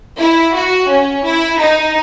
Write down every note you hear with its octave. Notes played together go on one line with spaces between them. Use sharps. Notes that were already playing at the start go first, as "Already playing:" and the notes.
E4
F#4
C#4
E4
D#4